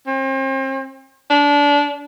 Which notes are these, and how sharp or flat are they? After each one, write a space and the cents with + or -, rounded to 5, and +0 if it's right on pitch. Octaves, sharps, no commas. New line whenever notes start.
C4 +40
D4 -25